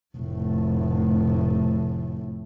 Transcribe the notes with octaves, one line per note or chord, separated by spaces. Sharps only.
F1 A2